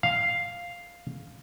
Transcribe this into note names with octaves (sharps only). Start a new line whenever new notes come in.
F5